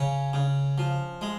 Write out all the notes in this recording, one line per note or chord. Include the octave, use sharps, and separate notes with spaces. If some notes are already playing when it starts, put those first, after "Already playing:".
Already playing: C#3 C#4
C#3
F3
G#3